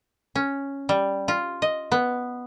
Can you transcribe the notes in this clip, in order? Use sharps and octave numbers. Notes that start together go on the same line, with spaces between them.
C#4
G3
F4
D#5
B3